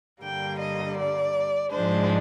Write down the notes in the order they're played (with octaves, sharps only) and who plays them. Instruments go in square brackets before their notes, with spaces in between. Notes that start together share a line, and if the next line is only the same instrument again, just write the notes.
[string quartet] G2 D3 G3 A#3 G5
D#5
D5
G#2 F3 G#3 D4 C5